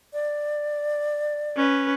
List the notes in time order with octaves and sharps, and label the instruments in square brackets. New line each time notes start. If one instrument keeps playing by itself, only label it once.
[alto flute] D5
[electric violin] C#4 B4